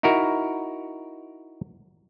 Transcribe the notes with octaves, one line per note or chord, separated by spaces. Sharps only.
D#4 E4 F#4 A#4